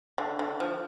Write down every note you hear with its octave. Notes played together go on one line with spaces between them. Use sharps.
D3
D3
F3